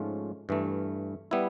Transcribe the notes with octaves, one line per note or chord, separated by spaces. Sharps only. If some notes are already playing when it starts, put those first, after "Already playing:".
Already playing: G#2 F3 A3 C#4 F4
G2 E3 A3
G3 B3 E4